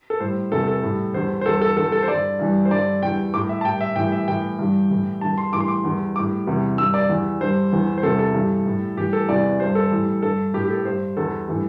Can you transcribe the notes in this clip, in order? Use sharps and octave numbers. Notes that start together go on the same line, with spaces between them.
A4
A2 G3 C5
E2 C3 E3 G3 A4
A4
A2 G3
E2 D3 G3 C5
C5
E2 D3 G3 A4
A4
E2 D3 G3 A4
A4
C5
G2 D3 G3 D5
G2 E3 G3
C5
G2 D3 G3 D5
E2 E3 G3 G5
A2 G3 D6
E5
A5
A2 G3 G5
E5
A2 E3 G3 G5
E5
A2 E3 G3 G5
G2 E3 G3
A2 E3 G3
E2 D3 G3 A5
C6
A2 E3 G3 D6
C6
D6
E2 D3 G3
A2 G3 D6
E2 C3 E3 G3
G2 D3 G3 E6
D5
E2 E3 G3
G2 D3 G3 C5
E2 E3 G3
C5
E2 C3 G3 A4
A4
G2 E3 G3
A2 G3
A2 E3 G3 G4
A4
E2 C3 E3 G3 D5
G2 G3 C5
A4
A2 E3 G3
G2 D3 G3 A4
A2 G3 G4
G4
A4
G2 G3 C5
E2 D3 G3 A4
A2 E3 G3